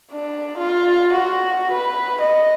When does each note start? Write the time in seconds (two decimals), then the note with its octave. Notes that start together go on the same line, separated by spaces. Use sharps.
0.12 D4
0.58 F4
1.13 F#4
1.72 B4
2.21 D#5